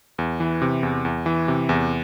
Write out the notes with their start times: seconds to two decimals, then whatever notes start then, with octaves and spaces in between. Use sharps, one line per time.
0.18 E2
0.40 E3
0.62 C3
0.83 E2
1.05 E2
1.26 E3
1.48 C3
1.69 E2